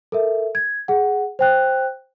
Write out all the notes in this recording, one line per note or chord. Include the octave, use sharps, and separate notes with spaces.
A4 A#4 E5
G#6
G#4 F#5
C5 G5 F#6